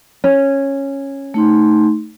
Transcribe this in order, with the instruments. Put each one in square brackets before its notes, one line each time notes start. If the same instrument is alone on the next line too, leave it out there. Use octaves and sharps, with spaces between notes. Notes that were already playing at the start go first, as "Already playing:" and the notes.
[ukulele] C#4
[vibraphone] A3 D#4 C6